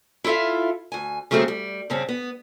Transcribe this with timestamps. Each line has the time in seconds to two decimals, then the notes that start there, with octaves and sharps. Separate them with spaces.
0.24 E4 F4 A4 E5 F5
0.92 D2 G#5
1.31 C#3 F#3 A3 A#3 C4 G#4
1.48 G3
1.90 G2 C#3 C4 C#4
2.09 B3